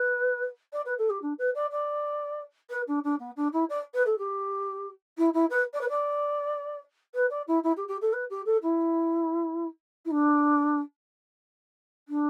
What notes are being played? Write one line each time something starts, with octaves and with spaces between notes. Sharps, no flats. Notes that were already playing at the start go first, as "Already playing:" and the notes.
Already playing: B4
D5
B4
A4
G4
D4
B4
D5
D5
B4
D4
D4
B3
D4
E4
D5
B4
A4
G4
E4
E4
B4
D5
B4
D5
B4
D5
E4
E4
G4
G4
A4
B4
G4
A4
E4
E4
D4
D4